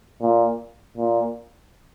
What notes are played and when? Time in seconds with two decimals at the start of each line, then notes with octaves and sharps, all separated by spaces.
0.21 A#2
0.97 A#2